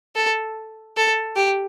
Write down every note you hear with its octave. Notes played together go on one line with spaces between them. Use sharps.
A4
A4
G4